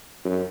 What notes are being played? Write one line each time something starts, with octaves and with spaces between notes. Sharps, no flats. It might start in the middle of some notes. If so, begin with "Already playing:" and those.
F#2